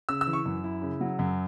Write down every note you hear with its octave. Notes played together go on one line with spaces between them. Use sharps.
C#3 E6
E6
E3
C#6
F#2
E4
C#3
F#3
F#2